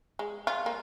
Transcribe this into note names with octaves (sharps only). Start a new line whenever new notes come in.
G#3
F4
A#3